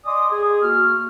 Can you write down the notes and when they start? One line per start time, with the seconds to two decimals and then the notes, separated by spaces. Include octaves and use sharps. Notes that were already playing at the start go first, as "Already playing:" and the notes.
0.05 D5 D#5 G#5 C6 D6 D#6
0.31 G#4
0.62 A#3 F#4 F6